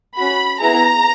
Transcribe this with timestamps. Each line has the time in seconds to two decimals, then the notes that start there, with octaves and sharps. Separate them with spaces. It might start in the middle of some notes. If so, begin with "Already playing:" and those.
0.17 C#4 F#4 B5
0.60 B3 E4 G#4 A#5